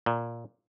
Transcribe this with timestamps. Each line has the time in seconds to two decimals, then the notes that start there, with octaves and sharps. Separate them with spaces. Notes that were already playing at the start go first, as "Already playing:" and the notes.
0.06 A#2